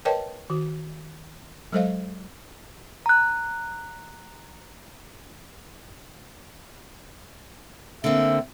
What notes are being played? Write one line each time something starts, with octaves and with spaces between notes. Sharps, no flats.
A#4 B4 C#5 D#5 G5 A5
D#3 F#4
F#3 G#3 A4 C5 D#5 F5
A#5 F#6
D3 A#3 C4 E5